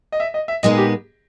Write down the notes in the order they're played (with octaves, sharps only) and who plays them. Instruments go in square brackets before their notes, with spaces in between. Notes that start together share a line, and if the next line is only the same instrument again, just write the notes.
[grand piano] D#5
E5
D#5
E5
[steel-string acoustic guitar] A#2 G#3 B3 D#4 [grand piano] D#5
[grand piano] G#4
G4